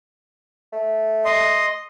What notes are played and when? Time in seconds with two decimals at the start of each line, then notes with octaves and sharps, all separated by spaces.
0.73 A3
1.25 D#5 C6